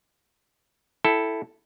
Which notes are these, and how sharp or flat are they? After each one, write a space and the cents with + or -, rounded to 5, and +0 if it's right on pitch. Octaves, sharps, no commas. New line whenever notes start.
E4 +0 A4 +0 G5 +0